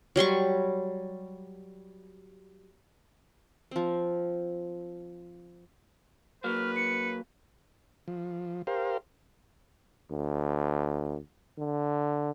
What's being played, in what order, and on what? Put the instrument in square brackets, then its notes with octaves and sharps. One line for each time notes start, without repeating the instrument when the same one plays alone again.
[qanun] F#3 G3 C6 C#6
F3 C4
[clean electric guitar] F#3 A#3 [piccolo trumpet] B4 [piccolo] F6
[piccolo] C#7
[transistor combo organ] F3
G4 A#4 C5 F5
[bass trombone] D2
D3